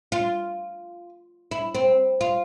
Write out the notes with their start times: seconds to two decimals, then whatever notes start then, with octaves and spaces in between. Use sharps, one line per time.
0.12 F4
1.51 E4
1.75 C4
2.21 F4